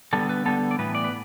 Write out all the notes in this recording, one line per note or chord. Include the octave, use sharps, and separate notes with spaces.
D3 G3 B3 A4
B4
D3 G3 B3 A4
D5
A2 E3 B3 B4
D5
B4